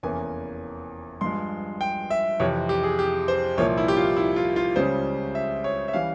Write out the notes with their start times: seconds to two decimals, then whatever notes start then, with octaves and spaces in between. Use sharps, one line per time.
0.03 F1 E2 E3 A#3 C#4 G#5
1.21 G2 F3 G#3 C6
1.81 G5
2.10 E5
2.40 F2 C3 E3 C#5
2.69 G4
2.83 G#4
2.99 G4
3.28 C5
3.58 C2 A#2 F3 A#3 C#5
3.78 E4
3.88 G4
3.97 F4
4.17 E4
4.36 F4
4.56 F4
4.76 C#2 C#3 G3 C#4 C5
5.35 E5
5.64 C#5
5.88 E5
5.93 E3 G3 C#4 F5